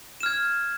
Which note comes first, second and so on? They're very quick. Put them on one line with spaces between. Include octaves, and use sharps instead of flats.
E7 F6 G#6